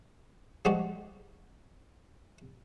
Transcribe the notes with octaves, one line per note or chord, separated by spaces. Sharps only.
F3 G3 G#3 F#4 G#4 D5